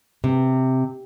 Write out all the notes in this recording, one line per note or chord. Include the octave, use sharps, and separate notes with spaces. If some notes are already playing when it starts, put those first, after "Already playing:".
C3